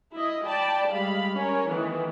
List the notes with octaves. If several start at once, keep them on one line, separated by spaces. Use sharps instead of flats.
E4 D#5
D5 G5 A5 B5
G3 G#3 F5 B5
C#4 A#4 C#5
D#3 E3 A3 B3